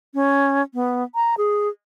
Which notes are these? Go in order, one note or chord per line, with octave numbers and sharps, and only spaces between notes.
C#4
B3
A#5
G#4